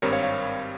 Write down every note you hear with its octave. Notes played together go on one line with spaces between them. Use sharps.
G#1 G2 G3 C4 A#4 C#5
C#5 F5
C#5 F5